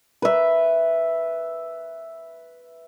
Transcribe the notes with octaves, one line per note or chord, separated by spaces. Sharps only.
B4 E5